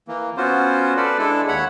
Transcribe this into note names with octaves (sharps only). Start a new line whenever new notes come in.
E3 A#3
B3 C#4 F4 F#4 C5
A4 B4 D5
G#3 D4 E4 A4
D#2 C#5 F#5 B5